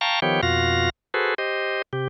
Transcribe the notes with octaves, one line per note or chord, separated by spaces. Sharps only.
F5 G5 A5 A#5 C#6
D#3 F3 B3 G4 C#5 G5
F2 B2 F4 F#4 F5 A#6
F#4 G#4 A4 B4 C5
G4 C5 D#5
C3 G4